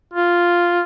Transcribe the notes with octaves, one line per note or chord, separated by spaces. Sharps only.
F4